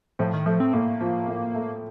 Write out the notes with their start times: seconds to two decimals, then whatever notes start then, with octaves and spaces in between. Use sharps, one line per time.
0.19 A2 F3
0.33 D#3
0.46 F3 A3
0.60 C4
0.73 A2 A#3
1.01 F3
1.28 A2
1.55 A3